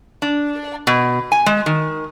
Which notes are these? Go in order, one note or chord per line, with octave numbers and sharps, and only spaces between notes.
D4
B2
G#5
G#3
D#3